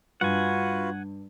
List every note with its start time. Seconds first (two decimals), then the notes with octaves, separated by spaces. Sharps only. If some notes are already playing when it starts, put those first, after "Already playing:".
0.21 G2 F4 F#4 B4 F#5 G#5